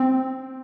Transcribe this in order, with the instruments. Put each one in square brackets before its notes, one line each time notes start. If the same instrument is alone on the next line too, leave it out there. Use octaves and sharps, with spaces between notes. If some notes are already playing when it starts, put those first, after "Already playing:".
Already playing: [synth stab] C4